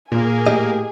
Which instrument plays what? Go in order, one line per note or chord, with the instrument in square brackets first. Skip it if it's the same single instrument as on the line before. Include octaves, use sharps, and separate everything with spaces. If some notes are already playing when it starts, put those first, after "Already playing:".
[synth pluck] A#2 [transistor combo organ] A#3 [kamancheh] G#4 G#5
[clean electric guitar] A2 G4 D#5